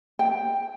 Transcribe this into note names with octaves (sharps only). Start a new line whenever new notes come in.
G5